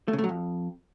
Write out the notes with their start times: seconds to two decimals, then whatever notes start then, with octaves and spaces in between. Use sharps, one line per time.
0.08 A3
0.13 C#3
0.18 A3
0.24 F#3
0.29 F2